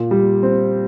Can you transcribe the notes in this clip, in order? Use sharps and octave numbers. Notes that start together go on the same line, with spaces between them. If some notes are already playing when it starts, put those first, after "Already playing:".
Already playing: A#2
G3
C4